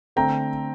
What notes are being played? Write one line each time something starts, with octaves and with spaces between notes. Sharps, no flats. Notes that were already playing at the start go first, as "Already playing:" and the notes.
D3 A3 C4 G5 A#5